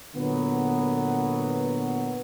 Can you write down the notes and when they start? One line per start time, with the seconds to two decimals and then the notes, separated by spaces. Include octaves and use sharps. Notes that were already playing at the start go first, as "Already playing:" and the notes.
0.15 A#2 D3 F#3 B3